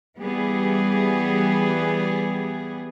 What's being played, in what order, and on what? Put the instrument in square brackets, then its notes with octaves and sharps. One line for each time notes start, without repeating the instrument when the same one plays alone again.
[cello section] E3 G3 B3 G#4